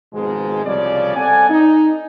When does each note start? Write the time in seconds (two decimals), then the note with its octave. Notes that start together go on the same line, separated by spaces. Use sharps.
0.13 G#1 G#2 B2 F3 G#3
0.65 C2 C#3 F3 G#3 C#4 D5
1.16 C4 A4 D5 F#5 G#5
1.50 D#4